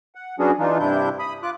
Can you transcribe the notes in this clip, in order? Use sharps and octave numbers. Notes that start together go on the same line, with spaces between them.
F#5
F#3 B3 C#4 D4 F#4 G#4
E3 D4 D#4 F4
G2 C3 D4 E4 G6
B5 D#6
F4 D6 F#6